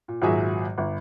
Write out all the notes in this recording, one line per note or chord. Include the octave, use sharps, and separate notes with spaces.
A#2
G#1 A#2 F#3 F#4 G#4 E5
G1